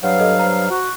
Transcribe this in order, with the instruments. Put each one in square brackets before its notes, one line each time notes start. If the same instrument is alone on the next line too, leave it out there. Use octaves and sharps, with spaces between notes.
[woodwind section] G2 F#3 F5 [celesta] B4 C#5 F#5
[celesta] A4 D#5
C5 A#5
[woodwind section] F#4